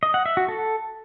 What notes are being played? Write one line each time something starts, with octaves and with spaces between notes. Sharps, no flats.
D#5
F#5
E5
F#4
A4